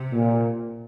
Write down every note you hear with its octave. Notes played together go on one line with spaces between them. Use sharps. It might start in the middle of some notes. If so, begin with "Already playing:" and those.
Already playing: C3
A#2